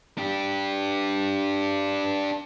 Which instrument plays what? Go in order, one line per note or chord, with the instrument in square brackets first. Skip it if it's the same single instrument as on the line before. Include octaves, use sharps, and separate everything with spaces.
[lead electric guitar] D4 G4